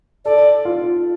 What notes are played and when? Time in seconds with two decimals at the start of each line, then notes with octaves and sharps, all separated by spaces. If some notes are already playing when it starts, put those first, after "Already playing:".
0.25 A4 D5
0.65 F4